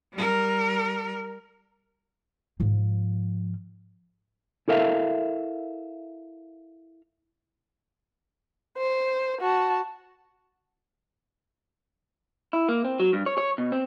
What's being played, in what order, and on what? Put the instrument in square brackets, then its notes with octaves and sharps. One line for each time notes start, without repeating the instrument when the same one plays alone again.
[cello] G3 A#4
[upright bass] G#2 F3
[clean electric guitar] E4 A4 A#4 E5 F5
[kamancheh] C5
F#4 A5
[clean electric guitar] E4
A#3
C4
F#3
G2
C#5
C#5
B2
C4